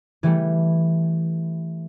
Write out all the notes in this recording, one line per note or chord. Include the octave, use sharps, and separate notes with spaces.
E3 G3 A3